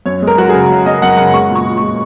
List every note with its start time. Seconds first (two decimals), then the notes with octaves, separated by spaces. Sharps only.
0.06 F#2 C#5
0.22 G#3
0.27 A#4
0.38 F#2 F#4
0.49 G#4
0.55 C#3
0.70 F#2
0.86 G#3 D#5
1.02 F#2 F#5
1.18 C#3 F#5
1.34 G#3 C#6
1.49 A#2
1.55 C#6
1.66 A#2
1.77 C#6
1.82 G#3